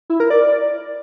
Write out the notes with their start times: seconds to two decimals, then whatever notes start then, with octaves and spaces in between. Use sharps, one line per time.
0.10 E4
0.20 A#4
0.30 D5